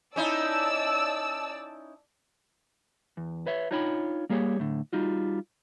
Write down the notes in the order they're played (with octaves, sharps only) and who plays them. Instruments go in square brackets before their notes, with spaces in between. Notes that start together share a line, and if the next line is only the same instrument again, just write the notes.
[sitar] C#4 D#4 E4 [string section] D5 A5 E6
[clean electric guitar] E2
B4 C#5 E5
D4 D#4 F4 C#5 G5 B5
G3 A#3 G4 G#4 C#5
A2 D3
G3 D#4 F4 F#4